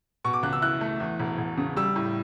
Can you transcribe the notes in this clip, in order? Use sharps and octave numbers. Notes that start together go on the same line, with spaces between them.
B2 C#6
D6
C#2 F#6
E6
E4 F#6
A3
E2
E1
E1
C#3
G3 E6
A2